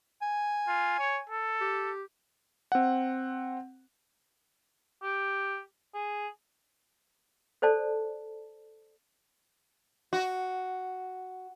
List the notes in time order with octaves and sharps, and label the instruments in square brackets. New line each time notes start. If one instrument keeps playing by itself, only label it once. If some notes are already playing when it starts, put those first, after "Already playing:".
[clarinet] G#5
[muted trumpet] F4
C#5
A4
[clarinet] G4
[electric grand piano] C4 F#5
[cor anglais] G4
G#4
[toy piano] A4 C5 D5 A5
[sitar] F#4